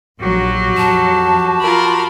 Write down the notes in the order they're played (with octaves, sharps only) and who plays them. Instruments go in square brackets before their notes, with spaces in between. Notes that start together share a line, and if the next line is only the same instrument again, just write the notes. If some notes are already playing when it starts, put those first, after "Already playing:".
[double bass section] A#1 [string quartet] F#3 [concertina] F#4 G4
[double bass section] F2 [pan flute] A5
[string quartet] F4 A#4 B5